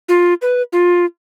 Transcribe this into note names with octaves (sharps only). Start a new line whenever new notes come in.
F4
B4
F4